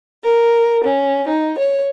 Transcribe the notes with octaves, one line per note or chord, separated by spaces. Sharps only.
A#4
C#4
D#4
C#5